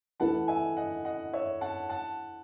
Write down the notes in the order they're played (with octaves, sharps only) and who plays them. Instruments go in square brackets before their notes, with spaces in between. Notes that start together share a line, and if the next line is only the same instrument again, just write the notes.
[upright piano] E3 A3 E4 B4 [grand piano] F#5 A5
[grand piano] E5 G#5
D#5 F#5
D#5 F#5
C#5 E5
F#5 A5
F#5 A5